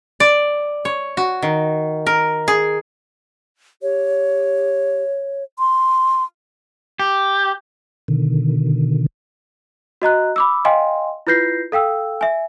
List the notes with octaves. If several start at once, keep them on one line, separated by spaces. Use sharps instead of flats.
D5
C#5
F#4
D#3
A#4
G#4
G4 C#5
C6
G4
B2 D3 D#3
F#4 D#5 A#5 F#6
B5 D6 E6
D#5 F5 G5 G#5 C6
E4 F4 B4 G6 A#6 C7
A4 F5 G5 E6
E5 G#5